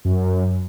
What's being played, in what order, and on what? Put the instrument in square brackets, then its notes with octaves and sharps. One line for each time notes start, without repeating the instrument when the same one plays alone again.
[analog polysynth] F#2